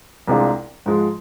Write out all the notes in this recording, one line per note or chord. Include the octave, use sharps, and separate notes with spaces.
C2 C3 G#3 D4 F4
G#2 F3 G#3